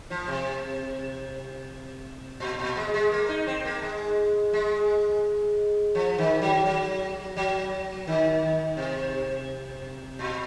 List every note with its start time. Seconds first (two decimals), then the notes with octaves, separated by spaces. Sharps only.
0.10 F3
0.28 C3
2.40 A#2
2.59 A#2
2.77 G#3
2.94 G#3
3.12 A#3
3.29 D#4
3.47 C4
3.65 A#3
3.82 G#3
4.53 G#3
5.95 F3
6.18 D#3
6.42 F#3
6.66 F#3
7.37 F#3
8.07 D#3
8.77 C3
10.19 A#2